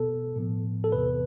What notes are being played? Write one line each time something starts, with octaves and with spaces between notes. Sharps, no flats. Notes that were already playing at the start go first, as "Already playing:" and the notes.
Already playing: B2 B3 A4
A2 F3 B3
A4
E2 C3 E3 B3 B4